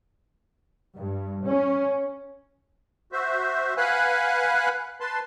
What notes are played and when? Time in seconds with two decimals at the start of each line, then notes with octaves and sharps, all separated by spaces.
0.95 G2
1.44 C#4
3.12 F#4 C5 E5
3.77 B4 F5 F#5 G#5 B5 F#6
5.01 B4 A5 C6